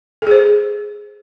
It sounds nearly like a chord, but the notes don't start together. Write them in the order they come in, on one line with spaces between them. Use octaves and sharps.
A4 G#4 C5